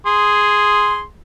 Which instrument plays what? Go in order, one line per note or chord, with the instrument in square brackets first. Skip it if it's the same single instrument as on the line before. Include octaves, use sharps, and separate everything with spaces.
[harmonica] G#4 C6